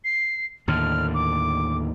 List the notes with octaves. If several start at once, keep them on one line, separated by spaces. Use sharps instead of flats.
C7
D#2 A2 D3 F6
D6